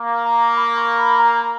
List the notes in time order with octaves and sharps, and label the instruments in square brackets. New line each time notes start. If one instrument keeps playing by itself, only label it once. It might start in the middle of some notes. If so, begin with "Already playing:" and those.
Already playing: [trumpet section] A#3
[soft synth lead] A#5
B5
C#6
B5
A#5